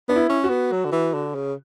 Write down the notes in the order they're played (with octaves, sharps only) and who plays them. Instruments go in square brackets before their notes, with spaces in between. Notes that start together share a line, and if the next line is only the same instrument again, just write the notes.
[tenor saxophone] B3 [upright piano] D4
[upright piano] E4
[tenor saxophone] C#4
[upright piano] F#4
[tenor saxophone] B3
F#3
D3
E3
D3
C#3